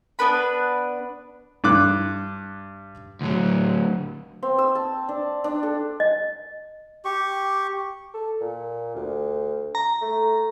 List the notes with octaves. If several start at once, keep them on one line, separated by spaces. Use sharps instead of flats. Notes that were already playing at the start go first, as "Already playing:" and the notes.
B3 D4 B4 B5
G2 D6 F#6
D2 F#3
C4
E6
A5
D4
D4
A4
D#5
G4 C#6
A4
A#2
D2
A#5
A3